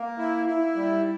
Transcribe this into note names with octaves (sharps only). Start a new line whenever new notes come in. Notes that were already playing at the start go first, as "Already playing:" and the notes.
Already playing: A#3
E4
E4
G3